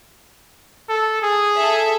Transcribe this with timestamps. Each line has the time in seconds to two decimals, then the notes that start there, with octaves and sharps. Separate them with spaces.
0.89 A4
1.22 G#4
1.57 A4 E5